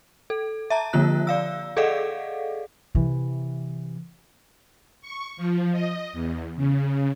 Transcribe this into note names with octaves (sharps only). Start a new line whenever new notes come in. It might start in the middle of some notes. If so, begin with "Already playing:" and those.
A4
E5 A5 A#5
D3 F3 A#3 F4 F#6
D5 F5 E6
G#4 A4 D5 D#5 F5 F#5
C3 E3
C#6
F3
D#5
E2
C#3